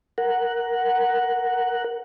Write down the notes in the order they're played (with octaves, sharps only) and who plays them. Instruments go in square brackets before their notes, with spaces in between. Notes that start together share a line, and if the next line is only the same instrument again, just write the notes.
[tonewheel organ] A#4 F#5